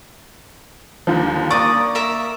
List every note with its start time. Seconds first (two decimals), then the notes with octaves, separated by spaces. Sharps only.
1.07 D#2 D3 F3
1.51 A#3 D5 C#6 D#6
1.95 A#4 E5 A#5